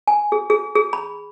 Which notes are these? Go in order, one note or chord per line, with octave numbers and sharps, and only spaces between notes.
G#5
G#4
G#4
G#4
B5